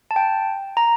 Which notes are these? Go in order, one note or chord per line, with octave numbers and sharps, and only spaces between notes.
A5
G5
A#5